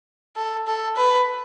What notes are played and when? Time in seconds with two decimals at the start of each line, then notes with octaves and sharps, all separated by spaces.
0.36 A4
0.67 A4
0.96 B4